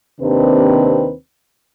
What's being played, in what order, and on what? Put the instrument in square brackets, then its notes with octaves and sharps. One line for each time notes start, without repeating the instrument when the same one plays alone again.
[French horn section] D#2 C3 D#3 C4 D4 B4